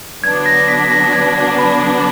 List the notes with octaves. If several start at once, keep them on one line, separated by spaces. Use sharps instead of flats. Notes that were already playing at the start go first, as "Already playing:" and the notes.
D3 F#3 B3 D4 G#6
A#6
B6
A#6
G#6
B5